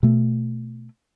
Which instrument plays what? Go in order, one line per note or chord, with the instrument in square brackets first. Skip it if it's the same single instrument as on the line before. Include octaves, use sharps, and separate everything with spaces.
[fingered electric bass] B2 A3